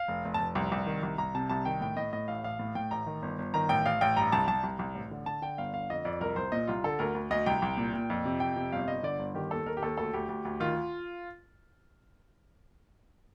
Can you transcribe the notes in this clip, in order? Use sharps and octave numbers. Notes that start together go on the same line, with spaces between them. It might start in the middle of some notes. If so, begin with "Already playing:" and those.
Already playing: F5
F1
F1
A5
F1
C2
C2
D#3
C2
C2 A#5
C3 A5
C2 A5
D#3 G5
A2 G5
A2 D#5
A2 D#5
A1 F5
A1 F5
A2
A2 G5
A1 A#5
D#3
G1
G1
D#3 A#5
A1 G5
A1 F5
A1 G5
G2 A#5
C2 A5
C2 A5
C2
C2
A1
D3
D3 A5
D3 G5
G1 F5
D3 F5
F2 D#5
F2 D5
C2 A#4
C2 C5
A#2 D#5
C2 F4
D3 A4
D2 A#4
D2
D2 D#5
C2 G5
C2
A#2
A#2
F2
C3
F2 G5
C3
G1 F5
G1 D#5
D3 D5
G1
D#3 G4
D#2 A4
D#3 A#4
G4
D#2 A4
D2 A4
D2 G4
D2
D2
D#3 F4